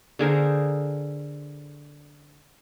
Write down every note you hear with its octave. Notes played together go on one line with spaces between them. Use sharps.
D3 G#4 A#4 C5